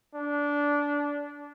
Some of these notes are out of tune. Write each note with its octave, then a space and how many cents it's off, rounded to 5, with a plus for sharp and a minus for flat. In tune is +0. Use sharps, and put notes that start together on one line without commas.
D4 -15